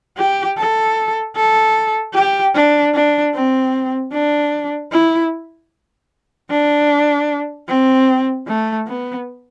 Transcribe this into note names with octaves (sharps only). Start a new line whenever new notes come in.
G4
A4
A4
G4
D4
D4
C4
D4
E4
D4
C4
A3
B3